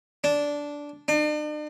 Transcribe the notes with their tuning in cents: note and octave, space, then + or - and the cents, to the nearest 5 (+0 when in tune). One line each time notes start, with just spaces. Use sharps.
D4 -10
D4 +45